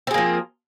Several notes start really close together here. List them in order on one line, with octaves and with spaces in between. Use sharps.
C4 G#4 A#3 F3